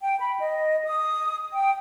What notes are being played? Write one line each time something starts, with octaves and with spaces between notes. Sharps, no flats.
G5
B5
D#5
D#6
G5